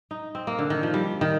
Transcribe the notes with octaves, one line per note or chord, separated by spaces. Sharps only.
D#4
C4
A#3
D3
D#3
F3
G3
D#3